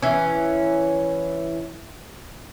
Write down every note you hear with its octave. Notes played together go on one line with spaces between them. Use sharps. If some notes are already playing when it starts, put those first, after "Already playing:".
E3 C#4